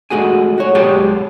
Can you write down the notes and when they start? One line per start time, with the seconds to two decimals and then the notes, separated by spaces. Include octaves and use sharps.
0.10 G#3 A3 F#4 G#4 G#5
0.58 F#4 C#5
0.75 B1 G#3 G4 G#4 C#5 A5